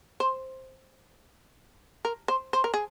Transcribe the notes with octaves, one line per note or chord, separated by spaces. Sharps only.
C5
A#4
C5
C5
A#4
G#4